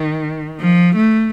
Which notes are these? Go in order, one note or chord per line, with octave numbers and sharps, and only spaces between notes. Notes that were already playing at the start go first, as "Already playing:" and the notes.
Already playing: D#3
F3
A3